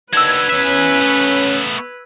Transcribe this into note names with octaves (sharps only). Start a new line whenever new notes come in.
D#2 D4 F#4 B4 E6 G#6
E2 C#4 E5
A3 B3